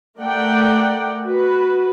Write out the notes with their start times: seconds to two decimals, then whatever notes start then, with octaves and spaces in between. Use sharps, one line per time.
0.19 A3 A#4 D5 F#5 G5
1.25 F#4 B4